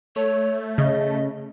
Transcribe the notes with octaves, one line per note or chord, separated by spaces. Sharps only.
A3 C#5
C#3 D#5